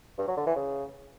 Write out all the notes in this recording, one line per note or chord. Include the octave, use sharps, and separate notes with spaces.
G2
F#3
D3
E3
C#3